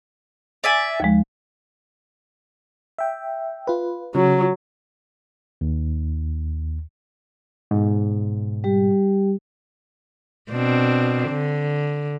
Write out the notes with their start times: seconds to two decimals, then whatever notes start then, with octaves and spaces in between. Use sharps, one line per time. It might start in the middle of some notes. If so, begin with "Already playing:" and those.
0.64 D5 E5 G#5
1.00 D#2 F3 G#3
2.98 E5 G5
3.67 F4 B4
4.15 C#3 F#3
5.61 D#2
7.71 G#2 B2
8.64 G3 G4
10.52 B2 C4 D4
11.29 D3